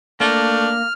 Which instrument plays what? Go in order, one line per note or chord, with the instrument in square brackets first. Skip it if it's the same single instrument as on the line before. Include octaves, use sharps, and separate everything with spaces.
[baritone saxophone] A3 [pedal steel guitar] A#3 [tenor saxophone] D4 [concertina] F6